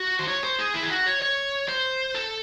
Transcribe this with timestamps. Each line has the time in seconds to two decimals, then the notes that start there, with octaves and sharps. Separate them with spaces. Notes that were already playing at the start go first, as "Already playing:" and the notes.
Already playing: F#4
0.19 C5
0.28 C#5
0.44 C5
0.59 G#4
0.74 E4
0.83 G#4
0.91 F#4
1.06 C#5
1.22 C#5
1.68 C5
2.15 A4